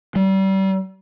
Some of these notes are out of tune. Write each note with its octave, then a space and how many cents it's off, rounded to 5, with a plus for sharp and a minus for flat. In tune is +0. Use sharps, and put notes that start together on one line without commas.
G3 -30